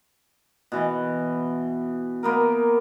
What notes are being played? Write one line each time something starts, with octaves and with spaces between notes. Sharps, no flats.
B2 E3
A#3 B3 A#4